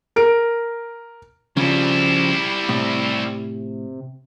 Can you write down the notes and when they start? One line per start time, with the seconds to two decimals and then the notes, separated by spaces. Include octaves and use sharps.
0.16 A#4 D7
1.57 C#3 F3 G3 E4
2.69 A2 C3